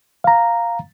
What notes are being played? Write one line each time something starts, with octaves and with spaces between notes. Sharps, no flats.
F5 A#5